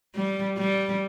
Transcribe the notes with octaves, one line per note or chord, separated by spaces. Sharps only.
G3
G3